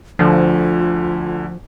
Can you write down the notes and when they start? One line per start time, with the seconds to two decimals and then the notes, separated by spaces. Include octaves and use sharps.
0.19 D2 D3 F3 F4